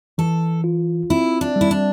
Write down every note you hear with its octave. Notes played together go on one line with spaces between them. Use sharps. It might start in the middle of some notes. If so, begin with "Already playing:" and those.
E3 A4
F4
C4 E4
D4
G3
E4
D4